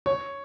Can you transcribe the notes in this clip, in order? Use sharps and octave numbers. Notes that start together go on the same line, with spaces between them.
C#5